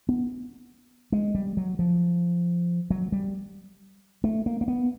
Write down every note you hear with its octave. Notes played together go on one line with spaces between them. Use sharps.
B3
G#3
G3
F#3
F3
F#3
G3
A3
A#3
A#3
B3